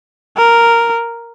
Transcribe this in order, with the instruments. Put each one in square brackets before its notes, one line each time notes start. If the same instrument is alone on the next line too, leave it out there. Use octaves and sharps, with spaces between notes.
[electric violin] A#4